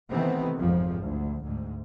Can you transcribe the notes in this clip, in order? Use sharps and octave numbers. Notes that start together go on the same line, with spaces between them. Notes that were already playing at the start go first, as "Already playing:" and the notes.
C3 D#3 E3 A3 B3 C4
G#1 F2 G#2 F3
D2
D2 G#2